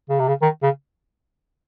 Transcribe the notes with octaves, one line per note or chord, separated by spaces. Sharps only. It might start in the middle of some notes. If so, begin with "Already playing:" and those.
C#3
C3
C#3
D#3
C#3